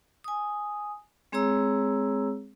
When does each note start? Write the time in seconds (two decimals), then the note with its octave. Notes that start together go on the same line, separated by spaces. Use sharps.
0.24 G#5 D#6
1.32 G#3 C4 G#4 C#5 A#5 E6